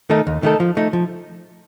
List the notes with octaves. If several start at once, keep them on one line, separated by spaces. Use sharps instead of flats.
D#3 A3 D#4 A4
D#2
D#3 A3 D#4 A4
F3
A3 D#4
F3